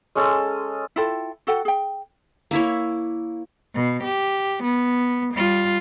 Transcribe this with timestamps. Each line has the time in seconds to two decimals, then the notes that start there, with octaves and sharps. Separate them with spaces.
0.15 G#3 C#4 G#4 A4
0.96 E4 F4 A4 G5
1.47 F#4 A4 F#5 G5
1.65 G#4 G5
2.51 A#3 E4 C#5
3.74 B2
4.04 G4
4.64 B3
5.34 G3 F4